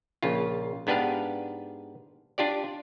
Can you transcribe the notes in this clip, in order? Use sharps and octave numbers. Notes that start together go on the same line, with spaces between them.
A#1 C#3 F4
G#2 B3 D4 G4 B4 F5
D4 F4 G4 D5